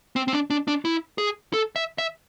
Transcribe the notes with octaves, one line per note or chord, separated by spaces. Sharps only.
C4
C4
D4
D4
D4
E4
G#4
A4
E5
E5